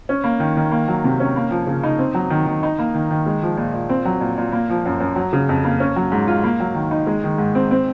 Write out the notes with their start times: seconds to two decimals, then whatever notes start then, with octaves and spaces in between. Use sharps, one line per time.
0.09 C#4
0.24 A#3
0.40 D#3
0.57 D#3
0.71 A#3
0.88 F#3
1.04 C3
1.20 C#4
1.36 A#3
1.51 F3
1.67 C#3
1.83 D#4
1.99 C4
2.14 F#3
2.30 D#3
2.46 D#3
2.63 D#4
2.79 A#3
2.94 D#3
3.11 D#3
3.26 G#3
3.42 F3
3.57 A#2
3.73 A#2
3.89 C4
4.05 F#3
4.21 A#2
4.38 A#2
4.52 A#3
4.70 F3
4.85 F#2
5.00 F#2
5.16 F#3
5.33 C#3
5.49 F2
5.64 A#3
5.80 C#4
5.96 F#3
6.12 G#2
6.28 F4
6.44 A#3
6.60 F#3
6.75 D#3
6.91 D#4
7.07 G#3
7.24 D#3
7.38 G#2
7.55 C4
7.71 C4